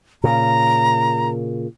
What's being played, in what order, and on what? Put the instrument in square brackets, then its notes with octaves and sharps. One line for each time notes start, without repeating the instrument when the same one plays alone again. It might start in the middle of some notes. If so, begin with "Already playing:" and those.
[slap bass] A#2 C#3 [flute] A#5